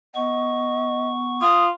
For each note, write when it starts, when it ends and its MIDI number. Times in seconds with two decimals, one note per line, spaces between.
0.15 1.42 59
0.15 1.09 75
0.15 1.42 85
1.42 1.70 65
1.42 1.65 87